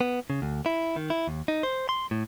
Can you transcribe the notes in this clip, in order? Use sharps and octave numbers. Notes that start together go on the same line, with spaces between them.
B3
C#3
D2
E4
D#3
E4
D#2
D#4
C5
C6
A2